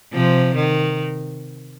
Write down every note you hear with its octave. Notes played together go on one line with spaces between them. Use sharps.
C3 F3
D#3